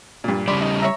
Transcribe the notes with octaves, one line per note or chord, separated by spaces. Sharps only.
G2 A#2
C#3 G3 D5 B5 C6
D#4
C#5 E5 A#5